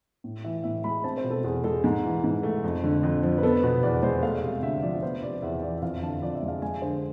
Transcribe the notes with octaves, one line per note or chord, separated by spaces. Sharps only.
A2
E3 E5
A2 E5
G#3 B5
C4 A5
C5
B2
A4
E2 G#4
G#3 A4
G#2
E3
G#2
A3
F2
D3
F2
F3
B4
B3 A4
B4
B2
E2 D5
G#3 C5
A3 F5
C3
D2 E5
F3 D5
B3 C5
C3 D5
E2 E5
E3 D5
E5
F2 F5
D3 A5
F2 D5
E5
G#3
F5
G#3 G#5
D3 C5